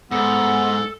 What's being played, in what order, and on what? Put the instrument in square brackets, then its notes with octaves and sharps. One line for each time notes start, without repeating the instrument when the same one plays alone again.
[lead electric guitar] G#2 [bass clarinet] B3 [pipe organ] A4